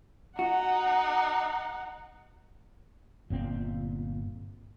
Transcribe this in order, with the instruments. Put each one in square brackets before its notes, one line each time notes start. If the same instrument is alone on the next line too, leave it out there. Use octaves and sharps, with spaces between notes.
[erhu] D#4 [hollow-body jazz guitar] F#4 [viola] F#5
[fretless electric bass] G1 A#2 C4